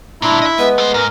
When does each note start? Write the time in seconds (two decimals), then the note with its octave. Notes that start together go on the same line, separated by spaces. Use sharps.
0.22 G2 A#2 D4 E4 C6
0.42 D#5 E5
0.58 G#3 B3 B4
0.78 A3 C5
0.94 G#2 A#4